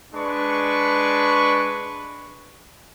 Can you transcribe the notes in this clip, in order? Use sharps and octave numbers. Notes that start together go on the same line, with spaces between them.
G#3 D4 B4 C#6